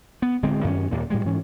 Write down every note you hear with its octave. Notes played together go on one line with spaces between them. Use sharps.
B3
D1 D3 G#3 C4
F#2 D#3 C#4
D#2 A#2
A2 G3 G#3
G#2 E3 C#4